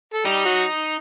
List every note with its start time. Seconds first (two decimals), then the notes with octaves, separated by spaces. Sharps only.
0.13 A4
0.25 G3 D#4 G4
0.45 F#3 F#4